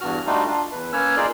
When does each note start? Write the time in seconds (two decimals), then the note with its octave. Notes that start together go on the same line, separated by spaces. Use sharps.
0.01 E2 G2 F#4 F6
0.26 G3 A3 D4 D#4 F4 F#4
0.47 D4 F4
0.72 E2 B4
0.93 A#3 C#4 B4 C#5 E6 F6
1.17 D#4 F4 G#4 A#4 D5